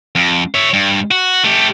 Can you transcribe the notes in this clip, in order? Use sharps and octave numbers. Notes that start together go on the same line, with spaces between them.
F2
C#5 E5
G2
F#4
A3 G4